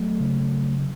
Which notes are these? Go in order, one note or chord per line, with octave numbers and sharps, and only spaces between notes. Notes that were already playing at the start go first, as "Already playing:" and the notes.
Already playing: F#3 A3
C#3